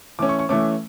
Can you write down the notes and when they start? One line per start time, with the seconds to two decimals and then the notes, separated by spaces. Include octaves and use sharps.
0.19 E3 A3 C#4 D6
0.29 C#6
0.39 C#6
0.49 E3 A3 C#4 D6